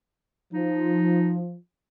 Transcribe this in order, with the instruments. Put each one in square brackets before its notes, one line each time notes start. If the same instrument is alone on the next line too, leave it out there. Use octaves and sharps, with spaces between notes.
[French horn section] F3 [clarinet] D#4